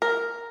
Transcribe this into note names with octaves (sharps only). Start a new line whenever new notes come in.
A#4